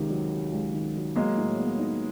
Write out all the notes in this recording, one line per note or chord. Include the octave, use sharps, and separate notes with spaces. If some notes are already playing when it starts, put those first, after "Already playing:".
Already playing: C#2 C3 D#3
F#3
C3
C#2
D#3
F#3
F#3 G#3 A#3
A2
B3
D#4